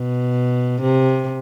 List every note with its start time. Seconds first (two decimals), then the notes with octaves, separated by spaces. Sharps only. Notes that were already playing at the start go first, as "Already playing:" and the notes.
Already playing: B2
0.82 C3